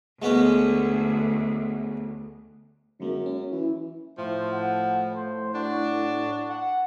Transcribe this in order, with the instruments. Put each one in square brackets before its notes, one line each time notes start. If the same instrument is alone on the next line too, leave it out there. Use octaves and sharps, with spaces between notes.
[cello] D2 [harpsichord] G#3 B3 C#4
[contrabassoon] F#2 [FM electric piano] D3 G#3 A#3
[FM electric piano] C#4
[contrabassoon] E3
[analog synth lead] A2 [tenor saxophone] F3 [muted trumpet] C5
[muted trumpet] F#5
C5
[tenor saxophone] D4 [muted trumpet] F#4
[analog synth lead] F#5